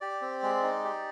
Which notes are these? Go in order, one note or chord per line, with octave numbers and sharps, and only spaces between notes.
G4 D5
C4
G#3
D#4
G4